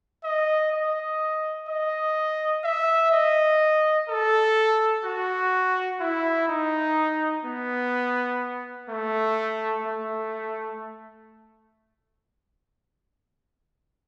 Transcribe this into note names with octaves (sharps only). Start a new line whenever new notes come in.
D#5
D#5
D#5
E5
D#5
A4
F#4
E4
D#4
B3
A3
A3